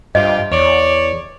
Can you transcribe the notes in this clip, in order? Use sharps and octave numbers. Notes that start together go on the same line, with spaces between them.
G2 C3 F4 G4 D#5
E2 C#5 D5